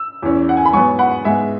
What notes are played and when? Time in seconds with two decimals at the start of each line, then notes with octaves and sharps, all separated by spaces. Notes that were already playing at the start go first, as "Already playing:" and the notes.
Already playing: E6
0.22 E2 E3 C#4
0.49 F#5
0.57 G#5
0.65 B5
0.73 G#2 F#3 B3 G#5 C#6
0.99 F#5 B5
1.25 G#2 G#3 B3 E5 G#5